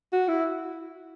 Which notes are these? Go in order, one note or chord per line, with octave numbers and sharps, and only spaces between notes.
F#4
E4